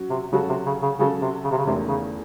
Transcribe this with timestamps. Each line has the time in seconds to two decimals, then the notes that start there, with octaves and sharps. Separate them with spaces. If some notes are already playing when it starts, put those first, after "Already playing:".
Already playing: F#3 C#4 F#4
0.10 C3
0.32 C#3 F#3 C#4 F#4 A4
0.49 C3
0.66 C#3
0.83 C#3
0.99 C#3 F#3 C#4 F#4 A4
1.21 C3
1.44 C#3
1.51 C3
1.58 C#3
1.66 E2 C3 D#3 A3 C#4
1.88 C#3